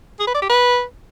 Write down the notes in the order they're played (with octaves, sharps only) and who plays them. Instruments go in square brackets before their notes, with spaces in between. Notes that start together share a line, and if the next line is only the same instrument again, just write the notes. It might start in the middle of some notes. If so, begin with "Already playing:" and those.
[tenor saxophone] G#4
B4
D5
G4
B4